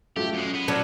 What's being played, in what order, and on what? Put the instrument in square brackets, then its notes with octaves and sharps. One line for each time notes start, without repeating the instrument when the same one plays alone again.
[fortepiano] F#3 A3 F4 [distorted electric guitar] G4
[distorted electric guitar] F#2 G#3 [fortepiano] C#4
[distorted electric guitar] B3
[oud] F#3 C#4 D4 [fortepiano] A5